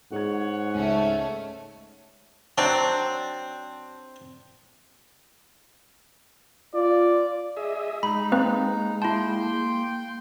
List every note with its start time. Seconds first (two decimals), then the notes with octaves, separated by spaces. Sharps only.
0.12 G#2 G#4 C#5 F#5 G#6
0.74 C#2 A3 C#4
2.58 F#3 C4 D4
6.74 F4 D5
7.57 G#4 D#5 E5
8.03 G#3 D#4 B5
8.32 A#3 C4 B4
9.02 A#3 E4 G5 A5 C6